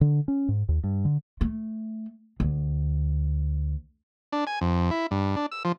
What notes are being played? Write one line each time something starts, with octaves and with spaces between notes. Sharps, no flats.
D3
C#4
G#2
D#2
G2
D3
A3
D2
D4
G#5
F2
E4
G2
D4
E6
F3